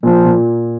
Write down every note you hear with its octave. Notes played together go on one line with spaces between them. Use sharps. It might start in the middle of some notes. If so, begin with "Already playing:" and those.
A#2 F3
A#2